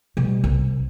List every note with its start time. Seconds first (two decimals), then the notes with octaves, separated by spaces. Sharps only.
0.17 B2 G3
0.44 C2